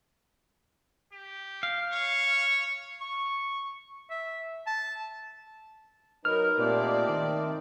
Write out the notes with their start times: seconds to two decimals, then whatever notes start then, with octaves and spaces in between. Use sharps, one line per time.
1.12 G4
1.63 F5
1.92 C#5
3.01 C#6
4.10 E5
4.67 A5
6.25 F#3 D#4 A#4 B4 F6
6.59 A#2 A3 C4 D#4 G4 D5
7.09 D#3